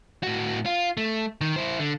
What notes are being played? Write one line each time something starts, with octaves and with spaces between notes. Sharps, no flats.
A2 F#4
F4
A3
D#3
E4 C5
D3